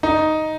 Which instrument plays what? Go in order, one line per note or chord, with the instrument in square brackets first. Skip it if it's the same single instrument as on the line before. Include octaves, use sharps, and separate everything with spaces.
[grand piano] D#4